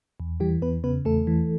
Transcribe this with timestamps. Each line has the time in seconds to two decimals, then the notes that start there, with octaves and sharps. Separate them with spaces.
0.20 E2
0.40 E3 G3 G4
0.62 E2 B3 B4
0.84 C#3 B3 B4
1.05 E2 A3 A4
1.27 E3